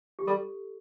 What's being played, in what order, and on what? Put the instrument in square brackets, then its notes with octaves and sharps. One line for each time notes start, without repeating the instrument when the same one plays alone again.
[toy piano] G4
[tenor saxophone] G3 [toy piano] A4